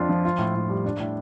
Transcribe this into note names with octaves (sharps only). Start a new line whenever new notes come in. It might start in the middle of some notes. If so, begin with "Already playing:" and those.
Already playing: F2 D4 F4
F3
F4
A2
A2
G3
D4
A2